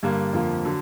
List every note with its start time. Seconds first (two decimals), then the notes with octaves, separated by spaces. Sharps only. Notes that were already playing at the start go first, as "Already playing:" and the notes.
0.03 G2 D3 G3 A#3
0.33 F2 D3 F3 A#3
0.65 D3 F#3